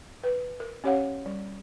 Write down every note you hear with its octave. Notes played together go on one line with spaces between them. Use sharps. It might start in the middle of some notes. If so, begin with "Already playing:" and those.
B4
A#4
C#4 G4 C#5 F5 F#5
G3